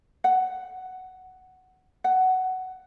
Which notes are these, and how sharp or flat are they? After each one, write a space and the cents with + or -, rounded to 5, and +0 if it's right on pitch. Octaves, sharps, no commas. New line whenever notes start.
F#5 +10
F#5 +15